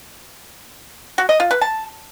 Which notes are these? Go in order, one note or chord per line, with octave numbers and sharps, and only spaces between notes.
F#4
D#5
F4
B4
A5